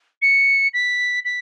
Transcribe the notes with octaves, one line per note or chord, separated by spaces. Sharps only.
C#7
B6
B6